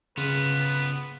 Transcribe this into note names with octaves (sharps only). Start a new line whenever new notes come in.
C#3 B3 F4 B4